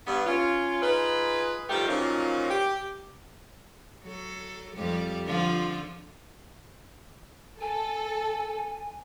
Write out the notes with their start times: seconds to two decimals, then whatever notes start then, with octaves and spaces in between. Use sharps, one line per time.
0.07 G2 B3
0.26 C#4 F4
0.82 D#4 F4 G#4 B4
1.69 D#3 F3 G3 A3 G4
1.88 A#2 F3 F#3 A#3 C#4 D#4
2.50 G4
4.03 F#3 A4
4.75 F2 G3 G4
5.26 D3 F3 F4
7.61 A4 G#5